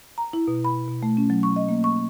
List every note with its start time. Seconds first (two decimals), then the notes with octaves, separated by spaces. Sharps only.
0.18 A#5
0.33 E4
0.48 B2
0.65 B5
0.88 B2
1.03 A3
1.17 C#4
1.30 F#3
1.43 C#6
1.56 D#5
1.68 A#3
1.84 C#6